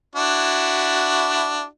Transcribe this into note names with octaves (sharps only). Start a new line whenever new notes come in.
D4 E4 F#4